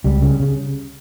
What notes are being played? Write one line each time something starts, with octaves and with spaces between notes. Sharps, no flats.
C#2 G3
C#3
C#3